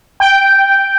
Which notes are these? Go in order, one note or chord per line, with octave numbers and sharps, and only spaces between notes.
G5